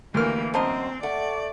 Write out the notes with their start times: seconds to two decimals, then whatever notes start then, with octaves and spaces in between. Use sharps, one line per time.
0.14 D2 E3 A#3 G4 A#4 F6
0.54 F#2 C4 C5 D#5 A5 A#5
1.03 A3 D5 F#5